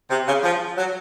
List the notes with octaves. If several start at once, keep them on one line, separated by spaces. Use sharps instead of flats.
C3
C#3
F3
F#3